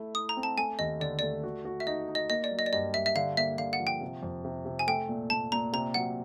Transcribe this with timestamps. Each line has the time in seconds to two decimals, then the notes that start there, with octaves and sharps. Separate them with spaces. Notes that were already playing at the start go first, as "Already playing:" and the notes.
Already playing: A3 E4
0.15 E4 D#6
0.29 A#5
0.37 C4
0.43 A5
0.57 A3 G#5
0.79 D#2 D#5
1.00 D3 D5
1.19 A3 D5
1.44 F#4
1.65 F#4
1.80 E5
1.87 D#4 D#5
2.08 D#4
2.15 D#5
2.30 A#3 D#5
2.44 D5
2.51 F#3
2.59 D#5
2.66 D5
2.73 G2 D#5
2.94 G2 E5
3.06 E5
3.16 D3 F5
3.37 A#3 E5
3.58 D3 F5
3.73 F#5
3.80 F3
3.87 G5
4.01 C3
4.23 F2
4.45 C3
4.65 C3
4.79 G#5
4.87 A3 G5
5.09 A#2
5.30 A#2 A5
5.52 A#2 A#5
5.73 C3 A#5
5.94 F#3 F#5